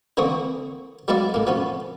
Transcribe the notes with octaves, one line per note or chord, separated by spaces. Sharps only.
D3 E3 A#3 C4 C#6 D#6
F#3 G#3 B3 E4 D5 F5
A2 A#3
F3 B3 C#4